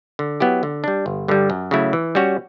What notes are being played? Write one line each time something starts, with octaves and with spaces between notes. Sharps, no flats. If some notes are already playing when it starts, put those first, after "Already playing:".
D3
F#3 B3 E4 G4
D3
G3 D4
G1
G2 D3 G3
F#2
C#3 F#3 A3 E4
E3
G3 C#4 F#4 C#5